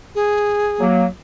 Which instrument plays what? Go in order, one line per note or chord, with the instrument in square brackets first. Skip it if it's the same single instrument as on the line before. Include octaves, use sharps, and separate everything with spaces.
[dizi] G#4
[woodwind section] F#3 A#3